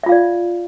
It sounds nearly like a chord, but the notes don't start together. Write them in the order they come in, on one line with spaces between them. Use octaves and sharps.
E5 F4 F5 D5